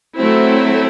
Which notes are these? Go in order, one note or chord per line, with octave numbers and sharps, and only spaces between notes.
F#3 A3 C4 E4